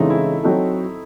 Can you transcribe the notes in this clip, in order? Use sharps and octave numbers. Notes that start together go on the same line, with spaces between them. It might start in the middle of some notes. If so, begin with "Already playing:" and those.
Already playing: C#3 E3 G#3 A3 C4 D#4
E4
F#3 C4 D#4 A4